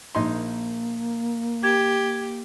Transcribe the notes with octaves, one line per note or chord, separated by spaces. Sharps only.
A#1 A#3 D#4 C6
G4 G#6